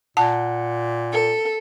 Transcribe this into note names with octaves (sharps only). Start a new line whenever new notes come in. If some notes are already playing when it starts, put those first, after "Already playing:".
A#2 F#5 A5
A4